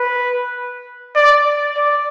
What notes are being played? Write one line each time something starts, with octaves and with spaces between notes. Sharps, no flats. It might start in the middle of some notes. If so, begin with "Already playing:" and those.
Already playing: B4
D5
D5